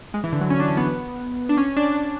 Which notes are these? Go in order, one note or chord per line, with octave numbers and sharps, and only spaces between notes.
G#3
E3
D3
F#3
C#4
D4
C#4
B3
D4
C#4
D4